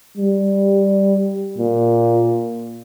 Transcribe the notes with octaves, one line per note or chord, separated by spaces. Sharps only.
G3
A#2